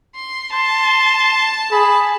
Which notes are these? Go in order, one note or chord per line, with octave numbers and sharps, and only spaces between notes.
C6
A5 C6
G#4 B5